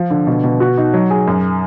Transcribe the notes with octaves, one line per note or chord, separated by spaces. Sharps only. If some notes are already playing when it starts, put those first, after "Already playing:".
Already playing: F3
D3
B2
B2
F#4
D#4
F#3
G#4
F#2